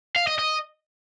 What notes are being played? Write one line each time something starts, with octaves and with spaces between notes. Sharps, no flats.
F5
D#5
D#5